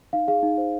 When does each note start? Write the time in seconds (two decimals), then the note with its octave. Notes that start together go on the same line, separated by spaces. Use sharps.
0.13 D#4 F5
0.28 G#4 F5
0.43 D#4
0.58 C5